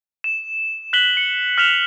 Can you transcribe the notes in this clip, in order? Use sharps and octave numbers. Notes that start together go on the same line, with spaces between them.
E7
F#6 B6 F#7 G7
C#7
F6 B6 E7 F7